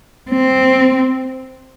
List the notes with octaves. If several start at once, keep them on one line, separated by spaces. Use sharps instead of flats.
C4